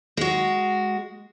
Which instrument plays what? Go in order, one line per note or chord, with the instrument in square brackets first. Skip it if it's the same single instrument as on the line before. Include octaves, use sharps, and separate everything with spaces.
[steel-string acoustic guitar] G#3 F#4